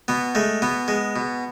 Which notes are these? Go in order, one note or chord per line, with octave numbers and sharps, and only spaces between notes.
B2 B3
G#3 A3
B2 B3
G#3
B2